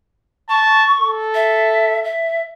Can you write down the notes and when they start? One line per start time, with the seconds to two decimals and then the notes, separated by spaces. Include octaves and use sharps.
0.50 A5 C#6
1.00 A4
1.35 E5
2.04 E5